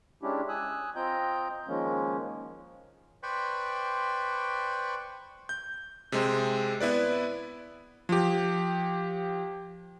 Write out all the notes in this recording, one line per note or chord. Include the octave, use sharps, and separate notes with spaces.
G#3 C#4 D4 E4 G4
G#5 D#6 E6 F#6
C4 F4 D#5 G5 A#5 G6
D#3 F3 G#3 A#3 C#4
B4 C5 D5 G5 B5 C#6
G6
C3 G#3 C4
B3 E4 B4 D5
F3 G4